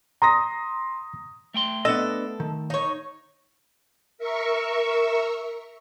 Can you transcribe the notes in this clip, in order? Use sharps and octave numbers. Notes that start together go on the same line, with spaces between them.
A#5 C6 D#6 A#6
A3 G5 C6
B3 D4 A4 D#5
D#3
D#4 C#5
A#4 E5 C#6